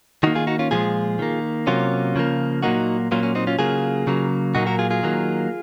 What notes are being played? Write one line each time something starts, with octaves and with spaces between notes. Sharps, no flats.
D#3 A#3 D#4 F#4
F4 G#4
D#4 F#4
C#4 F4
A#2 F3 G#3 F4 G#4
D#3 A#3
C3 F#3 A#3 C#4 F4
C#3 F3 A#3
A#2 F#3 A#3 D#4 F#4
A#2 F#3 A#3 C#4 F4
C#4
C4 D#4
C#4 F4
C#3 F#3 A#3 F4 G#4
C#3 F#3 A#3
A#2 F#3 A#3 D#4 F#4
F#4 A#4
F4 G#4
F4 G#4
D#3 F#3 A#3